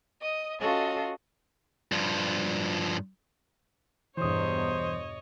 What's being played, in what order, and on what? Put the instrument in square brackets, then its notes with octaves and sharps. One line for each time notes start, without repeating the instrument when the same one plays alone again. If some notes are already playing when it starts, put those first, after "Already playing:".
[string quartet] D#5 D#6
C#4 F4 F#4 A4 D#5 F5
[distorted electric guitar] G2 F3
[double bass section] E2 G2 B2 [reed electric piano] E3 D#6 [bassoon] C5 [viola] C#5 D#5